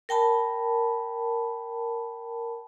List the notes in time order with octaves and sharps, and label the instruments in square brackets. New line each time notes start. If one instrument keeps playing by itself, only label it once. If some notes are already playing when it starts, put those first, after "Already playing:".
[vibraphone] A#4 G5 A5 B5